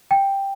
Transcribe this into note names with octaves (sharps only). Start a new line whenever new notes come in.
G5